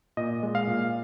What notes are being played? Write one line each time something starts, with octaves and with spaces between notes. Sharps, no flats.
A#2 D#5
G#3
F5
A#2